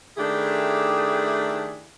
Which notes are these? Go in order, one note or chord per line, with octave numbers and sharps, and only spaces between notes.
D#3 A3 D4 E4 G4 G#4